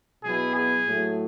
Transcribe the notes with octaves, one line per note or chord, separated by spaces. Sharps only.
B2 F#3 B3 E4 G#4
G#4
A2 F#3 A3